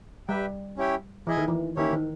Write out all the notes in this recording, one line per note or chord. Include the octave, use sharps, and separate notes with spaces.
G3 G4 B4 E5 G5
C#4 E4 G4 C#5 G5
E3 E4 G#4 D#5 G#5
D#3
E3
D#3 A#3 C#4 E4 G4 C#5
D#3